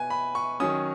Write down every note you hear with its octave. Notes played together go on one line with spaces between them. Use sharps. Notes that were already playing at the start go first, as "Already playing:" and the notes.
Already playing: B2 B4 G#5
B5
C#6
D#3 F#3 C#4 D#6